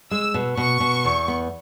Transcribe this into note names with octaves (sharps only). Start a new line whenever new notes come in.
G#3 E6
B2
B2 C#6
B2
E2
B3